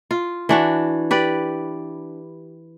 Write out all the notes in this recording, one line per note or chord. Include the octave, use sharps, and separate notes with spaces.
F4
E3 D4 F#4
G4 B4 D5